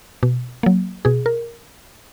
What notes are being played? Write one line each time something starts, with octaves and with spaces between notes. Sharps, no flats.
B2
F#3 A#3
B2 G#4
A#4